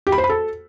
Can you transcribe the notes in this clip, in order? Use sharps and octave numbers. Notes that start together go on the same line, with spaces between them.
G4
B5
C5
B5
A4